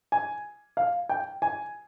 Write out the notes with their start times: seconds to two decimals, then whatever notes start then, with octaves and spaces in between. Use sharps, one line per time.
0.12 G#5
0.77 F5
1.09 G5
1.42 G#5